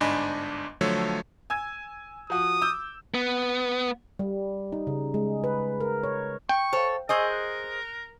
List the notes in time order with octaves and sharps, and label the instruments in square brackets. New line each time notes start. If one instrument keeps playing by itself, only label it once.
[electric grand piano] G1 G#2 D4 D#5 G#5 B5
D3 F3 F#3 A3 A4 C#5
[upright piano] G#5 E6 G#6
[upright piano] F3 F#4 [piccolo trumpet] D#6
[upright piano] D6 E6 G6
[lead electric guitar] B3
[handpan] G3
D#4
C#3
G#3
B4
A#4
C#5
[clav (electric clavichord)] G5 [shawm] C#6
[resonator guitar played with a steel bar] A4 C#5 [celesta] C5 F5
[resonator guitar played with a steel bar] G#4 C5 D#5 [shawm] A#4 [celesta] G#5 C#6 E6
[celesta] F#6